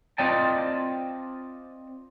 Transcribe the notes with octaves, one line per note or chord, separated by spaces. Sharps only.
C4 F4 D5 D#5 G5 A5